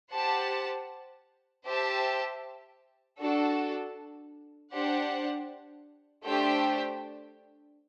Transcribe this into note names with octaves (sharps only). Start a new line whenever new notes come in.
G4 C5 F#5 A5
G4 C5 E5 A5
D4 F#4 A4
D4 G4 C5 F#5
A3 D4 G4 C5 G5